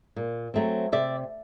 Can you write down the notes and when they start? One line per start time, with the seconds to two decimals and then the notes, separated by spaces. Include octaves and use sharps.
0.16 A#2
0.54 F#3 A3 C4
0.92 C3 D5 E5